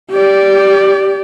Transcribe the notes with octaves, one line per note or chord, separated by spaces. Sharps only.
G4 D5